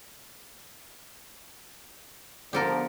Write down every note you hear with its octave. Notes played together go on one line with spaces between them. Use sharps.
D3 F3 B3 G4 A4 A#4